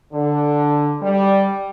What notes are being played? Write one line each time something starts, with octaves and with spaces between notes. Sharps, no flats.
D3
G3